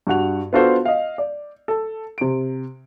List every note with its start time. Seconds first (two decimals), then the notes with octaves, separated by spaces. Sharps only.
0.07 G2 F#4 F#5 F7
0.53 B3 D4 F4 F#4 A4 C5
0.85 D#5 F5
1.18 D5
1.68 A4
2.18 C3 D7